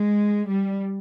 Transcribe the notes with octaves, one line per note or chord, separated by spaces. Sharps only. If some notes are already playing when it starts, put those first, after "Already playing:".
Already playing: G#3
G3